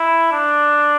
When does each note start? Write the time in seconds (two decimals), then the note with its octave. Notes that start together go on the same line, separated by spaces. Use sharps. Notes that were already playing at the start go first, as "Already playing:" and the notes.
Already playing: E4
0.32 D4